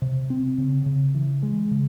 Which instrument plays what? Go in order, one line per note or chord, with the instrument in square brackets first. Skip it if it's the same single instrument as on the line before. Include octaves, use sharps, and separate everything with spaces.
[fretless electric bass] C3
C4
C#3
C#3
E3
G#3
C#3